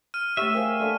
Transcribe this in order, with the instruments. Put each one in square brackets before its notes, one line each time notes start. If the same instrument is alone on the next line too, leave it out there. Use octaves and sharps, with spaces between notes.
[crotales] F6 D#7
[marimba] A3 G4 [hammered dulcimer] C#5 C#6 [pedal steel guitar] E5 [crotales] D#7
[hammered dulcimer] G4 G#4 [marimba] A#4 C5 F5
[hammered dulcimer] D3 A3 A#3